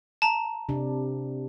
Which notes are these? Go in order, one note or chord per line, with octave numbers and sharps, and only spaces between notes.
A5 A#5
C3 D4